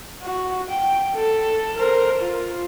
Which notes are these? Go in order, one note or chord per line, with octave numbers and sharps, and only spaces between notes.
F#4
G5
A4
A#4 C5
F4